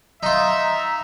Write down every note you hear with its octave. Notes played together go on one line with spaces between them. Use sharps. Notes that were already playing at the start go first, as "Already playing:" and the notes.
D#4 F4 E5 A#5